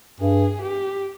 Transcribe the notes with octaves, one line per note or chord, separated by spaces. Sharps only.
G2 G#4
G4